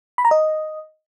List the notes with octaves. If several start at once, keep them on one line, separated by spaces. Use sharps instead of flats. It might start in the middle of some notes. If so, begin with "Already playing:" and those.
B5
A#5
D#5